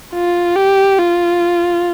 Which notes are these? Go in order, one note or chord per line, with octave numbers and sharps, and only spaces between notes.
F4
G4
F4